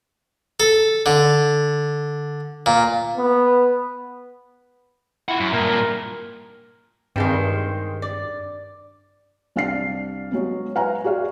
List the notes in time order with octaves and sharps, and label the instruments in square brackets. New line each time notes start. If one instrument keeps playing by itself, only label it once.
[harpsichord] A4
D3
A#2
[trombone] B3
[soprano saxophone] E4 [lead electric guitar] F4 F#5
[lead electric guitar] F#2
[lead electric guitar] G2 A#2 [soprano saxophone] A#4
[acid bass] G2 [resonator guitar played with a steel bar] D#3 G#3 C4
[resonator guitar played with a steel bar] D5
[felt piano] C2 D4 F5 F6 C7
F#3 G#3 B3
B4 F5 F#5 G#5 A#5
F#4 G#4 D5 F5